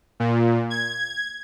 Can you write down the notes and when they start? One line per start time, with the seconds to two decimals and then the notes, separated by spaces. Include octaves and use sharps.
0.20 A#2
0.70 G#6